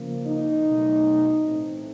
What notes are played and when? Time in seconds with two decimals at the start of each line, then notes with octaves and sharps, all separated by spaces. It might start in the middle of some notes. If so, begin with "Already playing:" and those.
Already playing: C#3 F3 A#3
0.26 D#4
0.65 B2 F#3 A3
1.43 A2 E3 A3 C4